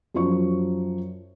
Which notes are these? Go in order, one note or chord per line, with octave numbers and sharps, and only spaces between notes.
F#2 F3 C#6